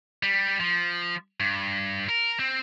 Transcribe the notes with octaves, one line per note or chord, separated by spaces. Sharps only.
G3
F3
G2
A#4
C4